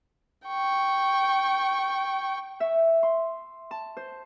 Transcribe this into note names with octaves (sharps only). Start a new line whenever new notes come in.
G5 C#6
E5
C6
A5
C5